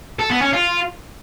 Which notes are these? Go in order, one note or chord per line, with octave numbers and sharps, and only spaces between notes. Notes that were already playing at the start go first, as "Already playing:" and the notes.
A4
B3
C#4
F4